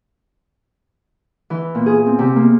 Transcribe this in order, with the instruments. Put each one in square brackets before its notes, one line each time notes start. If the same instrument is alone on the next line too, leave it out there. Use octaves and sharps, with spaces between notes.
[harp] E3
A#2
G#4
C4
C3
A#3